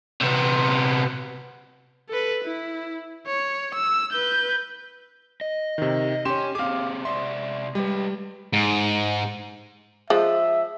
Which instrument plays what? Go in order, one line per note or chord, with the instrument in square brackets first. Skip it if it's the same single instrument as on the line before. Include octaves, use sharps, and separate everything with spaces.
[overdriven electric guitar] C3 B3
[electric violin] A4 B4
E4
C#5
E6
B4 G6
[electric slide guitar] D#5
[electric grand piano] C3 D#3
[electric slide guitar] C#4 C#5 [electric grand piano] G4 C6 E7
[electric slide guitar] C4 G4 G#4 [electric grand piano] F5 D6
[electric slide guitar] C3 D5 E5 [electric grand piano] C6
[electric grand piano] G3 [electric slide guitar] G#3 B4
[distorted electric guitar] G#2
[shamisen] F3 G#3 [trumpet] E5